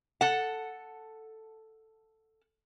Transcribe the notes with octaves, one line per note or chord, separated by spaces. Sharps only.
A4 F#5